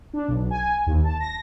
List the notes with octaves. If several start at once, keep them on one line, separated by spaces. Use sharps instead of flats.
D4
B1
G#5
D#2
A5
A#6